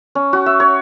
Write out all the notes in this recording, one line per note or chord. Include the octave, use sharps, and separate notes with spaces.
C#4
F#4
E5
C#5